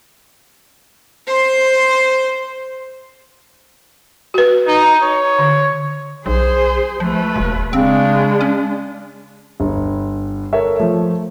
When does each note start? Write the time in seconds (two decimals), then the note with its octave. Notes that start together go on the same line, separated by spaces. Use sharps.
1.27 C5 C6
4.34 F#4 B4
4.67 D#4
5.03 C#5
5.39 D3
6.26 B1 G#4 C5
7.00 C#2 F3 A3 B4
7.36 E1 D#2
7.73 C#3 G#3 C4 D4
8.41 C#4
9.60 G1
10.53 A4 A#4 C#5 E5
10.80 F3 A3